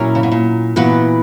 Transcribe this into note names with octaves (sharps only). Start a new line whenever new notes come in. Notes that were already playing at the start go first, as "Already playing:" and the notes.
Already playing: A#2 F#3 C#4 E4 A#4
C#3
B2
A#2
A#2 E3 B3 F#4 B4